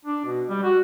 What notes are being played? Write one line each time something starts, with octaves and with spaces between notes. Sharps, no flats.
D4
B2
G3
F#4